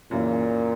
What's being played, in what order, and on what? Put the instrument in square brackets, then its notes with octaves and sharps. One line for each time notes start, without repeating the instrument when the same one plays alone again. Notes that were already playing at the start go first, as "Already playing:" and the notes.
[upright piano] F#2 C#3 E3 A#3 [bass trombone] A#2